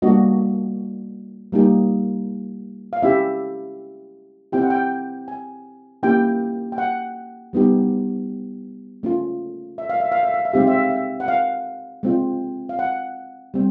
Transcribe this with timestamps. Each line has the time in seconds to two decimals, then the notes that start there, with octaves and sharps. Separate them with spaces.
0.02 G3 A#3 D4 F#4 D#5
1.52 G3 A#3 D#4 G4
2.93 F5
3.02 G#3 C#4 E4 G4 E5
4.52 C4 E4 G4 G5
4.62 F#5
4.70 G5
5.28 G#5
6.03 A#3 C#4 E4 G4 G5
6.72 G5
6.78 F#5
7.53 G3 B3 D#4 G4
9.03 A3 C#4 F4
9.78 E5
9.90 F5
10.00 E5
10.12 F5
10.23 E5
10.34 F5
10.45 E5
10.53 G#3 C4 D#4 G4 F5
10.67 E5
10.78 F5
10.90 E5
11.20 F#5
11.28 F5
12.03 G#3 C4 F4
12.69 F5
12.79 F#5
13.54 G3 C4